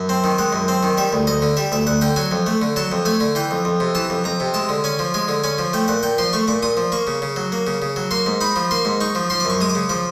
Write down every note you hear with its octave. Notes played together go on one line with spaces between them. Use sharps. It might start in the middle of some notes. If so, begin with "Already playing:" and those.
Already playing: F#2
C4
D#3
G#3 F#5
F#2
C4
D#3
G3 E5
D2
D2 D#5
D3
G3 E5
D2 E5
D2 F#5
D3 G5
F#3 G#5
F2
A3
D3
F#3 A5
F2
A3 G#5
D3
E3 G5
F2
F2
C3
E3 A5
F2
F2 A#5
C3
G#3 A5
D3
C#4 G#5
F3
G#3 G#5
D3
C#4 G#5
F3
A3 G5
A#2 F#5
A#2 G5
F3 C6
A3 C#6
A#2 D6
A#2 D#6
F3
A#3 C#6
C#3
C#3
F#3
A#3
C#3
C#3
F#3
A#3 C6
G#2
D#4 B5
F3
A#3 C6
G#2
D#4 C#6
F3
F3 C6
D6
F#2 C#6
G#3 D#6
D6
C#3
F3 D6